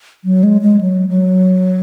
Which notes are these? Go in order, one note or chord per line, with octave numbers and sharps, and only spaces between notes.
F#3
G#3
G#3
F#3
F#3